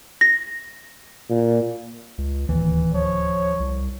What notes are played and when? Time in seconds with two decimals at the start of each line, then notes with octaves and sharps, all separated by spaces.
0.21 A#6
1.30 A#2
2.18 C#2
2.49 D1 D#2 E3
2.94 F3 C#5
3.60 C2